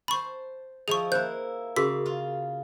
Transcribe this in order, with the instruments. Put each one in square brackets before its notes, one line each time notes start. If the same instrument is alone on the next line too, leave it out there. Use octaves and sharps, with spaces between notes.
[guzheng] C5 A5 [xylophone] B5 C#6
[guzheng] F3 E4 D#5 [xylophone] G#4 C#6
[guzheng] A#3 E4 [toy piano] C5 [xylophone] G6
[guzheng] C#3 [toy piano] F#4 G#4 A#4 [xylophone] B6
[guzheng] F4